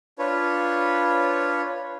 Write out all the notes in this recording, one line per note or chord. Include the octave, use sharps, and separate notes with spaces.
D4 F4 B4 C#5